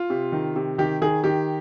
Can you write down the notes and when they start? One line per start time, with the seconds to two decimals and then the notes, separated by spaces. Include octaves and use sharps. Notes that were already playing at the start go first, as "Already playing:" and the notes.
Already playing: F4
0.10 C3
0.32 D#3
0.56 C3
0.78 D#3 G4
1.01 D#3 G#4
1.24 D#3 G4